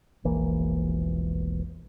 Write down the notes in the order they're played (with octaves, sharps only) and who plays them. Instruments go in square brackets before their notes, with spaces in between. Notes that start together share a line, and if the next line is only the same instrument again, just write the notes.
[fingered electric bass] E1 A#1 E3 A#3